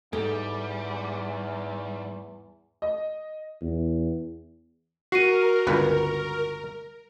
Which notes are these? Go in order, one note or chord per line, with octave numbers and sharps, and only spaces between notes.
E2 G#2 G3 A4
D#5
E2
F#4 A#4 C7 D#7
G1 C#2 B4